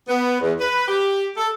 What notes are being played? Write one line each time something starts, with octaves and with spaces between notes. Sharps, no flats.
B3
E2
B4
G4
A4